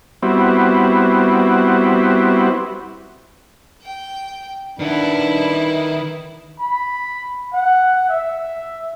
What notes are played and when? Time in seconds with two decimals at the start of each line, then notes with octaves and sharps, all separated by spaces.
0.23 G3 B3 C4 E4 F#4
3.83 G5
4.79 D#3 D4 E4 B4 F#5
6.60 B5
7.54 F#5
8.09 E5